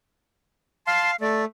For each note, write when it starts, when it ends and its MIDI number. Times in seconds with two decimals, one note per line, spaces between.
0.87 1.16 77
0.87 1.11 81
0.87 1.11 84
1.21 1.45 57
1.21 1.42 74